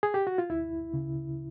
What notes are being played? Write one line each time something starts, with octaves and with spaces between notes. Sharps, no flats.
G#4
G4
F#4
F4
D2 E4
C#3